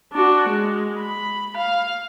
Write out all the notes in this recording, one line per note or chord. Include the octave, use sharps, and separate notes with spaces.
D4 F#4
G#3
B5
F5